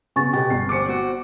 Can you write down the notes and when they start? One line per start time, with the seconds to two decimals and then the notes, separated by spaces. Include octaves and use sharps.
0.16 C#3 B3 C4 G#5 C#6 A6
0.33 B2 G4
0.50 G1 C7
0.69 E2 C5 D6 C#7
0.85 C4 F#4